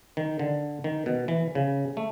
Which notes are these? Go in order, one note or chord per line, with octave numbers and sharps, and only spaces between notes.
D#3
D3
D#3
B2
E3
C#3
A3